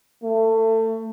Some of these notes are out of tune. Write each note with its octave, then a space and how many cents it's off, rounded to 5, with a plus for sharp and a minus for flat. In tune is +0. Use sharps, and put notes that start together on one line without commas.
A3 +25